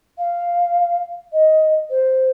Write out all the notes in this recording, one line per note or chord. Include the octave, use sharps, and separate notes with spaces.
F5
D#5
C5